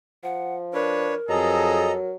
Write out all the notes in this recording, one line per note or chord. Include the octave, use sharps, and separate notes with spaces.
F3 F#5
D4 A#4 B4 C#5
F2 F#3 G#4 A4 D#5 A#5